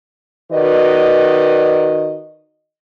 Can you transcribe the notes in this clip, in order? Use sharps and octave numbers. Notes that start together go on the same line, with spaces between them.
D#3 F#4 B4 D5 D#5